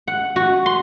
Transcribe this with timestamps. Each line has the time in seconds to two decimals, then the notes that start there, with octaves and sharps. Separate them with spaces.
0.08 F#5
0.36 F#4
0.66 C6